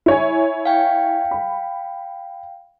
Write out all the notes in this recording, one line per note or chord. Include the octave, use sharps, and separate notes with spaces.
E4 C#5 G#5
F5 G5
B5